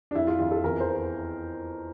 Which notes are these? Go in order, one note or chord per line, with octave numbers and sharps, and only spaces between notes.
D4
F2 E4
F4
F2 F4
A4
E2 A#4
C5